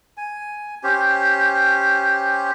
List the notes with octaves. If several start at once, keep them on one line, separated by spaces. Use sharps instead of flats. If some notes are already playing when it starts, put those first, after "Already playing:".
G#5
C#4 G4 C5